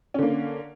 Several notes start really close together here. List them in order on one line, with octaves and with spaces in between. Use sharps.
C#4 D3 A#3